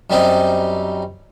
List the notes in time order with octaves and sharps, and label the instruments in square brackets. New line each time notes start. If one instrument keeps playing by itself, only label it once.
[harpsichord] F#2 G3 C4 D#4